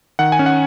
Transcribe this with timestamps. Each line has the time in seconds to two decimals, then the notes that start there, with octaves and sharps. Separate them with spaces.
0.19 D#3 F#5
0.32 G#5
0.39 C#4
0.46 F#5